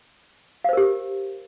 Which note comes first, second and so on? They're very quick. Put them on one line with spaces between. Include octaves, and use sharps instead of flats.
F5 C5 A#4 G4